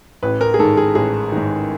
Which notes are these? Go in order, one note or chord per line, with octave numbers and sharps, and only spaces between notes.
A1 B4
A#4
G#4
G#2 D#3 A4
G#4
A1 G#4
G#2 D#3